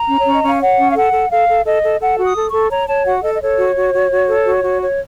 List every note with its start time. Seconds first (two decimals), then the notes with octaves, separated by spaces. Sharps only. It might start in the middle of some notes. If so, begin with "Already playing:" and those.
Already playing: A#5
0.08 C#4
0.19 C#5
0.26 C#4
0.33 D#5
0.43 C#4 F5
0.60 C#5 F#5
0.78 C#4
0.90 F5
0.95 A4 F#5
1.12 A4
1.30 A4 F5
1.48 A4
1.65 A4 D#5
1.83 A4
2.01 A4 F#5
2.17 F#4
2.24 D#6
2.36 A4
2.48 A4 C#6
2.71 C#5 A#5
2.88 C#5 A5
3.05 F#4 F#5
3.23 A4 D#5
3.34 D#5
3.41 A4 C#5
3.58 F#4
3.76 F#4
3.93 F#4
4.11 F#4
4.28 A4
4.46 F#4
4.63 F#4
4.81 C#5